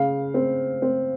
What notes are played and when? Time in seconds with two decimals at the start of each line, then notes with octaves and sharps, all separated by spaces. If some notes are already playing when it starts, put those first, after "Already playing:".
Already playing: C#3 F5
0.34 C4
0.82 C4